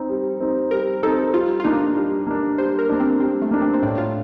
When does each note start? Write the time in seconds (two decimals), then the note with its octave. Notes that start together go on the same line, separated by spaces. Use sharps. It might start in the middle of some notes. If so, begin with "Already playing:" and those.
Already playing: C4 D#4
0.09 G3
0.41 C4 D#4
0.71 G3 A#4
1.03 C4 D#4 A4
1.34 G3 F4
1.60 F4
1.64 A#3 D4 D#4
1.97 G3
2.27 A#3 D4
2.58 G3 C5
2.79 A#4
2.89 A#3 D4
3.00 C4
3.20 G3 C4
3.42 A3
3.51 A#3 D4
3.62 C4
3.74 C4
3.82 A2 D4
3.98 F4